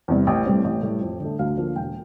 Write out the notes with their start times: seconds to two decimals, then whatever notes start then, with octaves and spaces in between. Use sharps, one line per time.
0.08 E2 C3 G3
0.27 A1 G5
0.46 A2 G3 C4
0.64 A1
0.83 A2 G3
1.01 F2
1.20 D3 A3
1.39 D2 F5
1.57 D3 F3 A#3
1.76 E1 G5